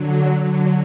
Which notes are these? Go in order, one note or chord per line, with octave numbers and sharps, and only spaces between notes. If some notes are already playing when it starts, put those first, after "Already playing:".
Already playing: D3 F#3
D3 F#3